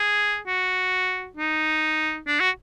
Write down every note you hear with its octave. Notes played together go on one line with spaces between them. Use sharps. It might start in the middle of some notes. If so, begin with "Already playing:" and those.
Already playing: G#4
F#4
D#4
D4
F#4